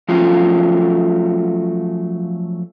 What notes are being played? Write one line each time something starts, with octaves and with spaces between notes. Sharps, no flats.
F3 F#3 A3 C#4 F4